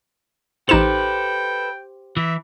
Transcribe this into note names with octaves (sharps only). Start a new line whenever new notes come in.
A1 D#4 G4 A4 B4 C5 G5 E7
E3 E5